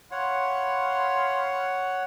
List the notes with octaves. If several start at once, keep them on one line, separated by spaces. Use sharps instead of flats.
C#5 F5 F#5 B5 C6